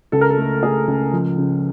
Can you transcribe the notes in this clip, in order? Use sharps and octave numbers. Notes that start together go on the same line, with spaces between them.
C#2 A4
A#4
A4
A3
A3 G#4
C#2
F3
C#3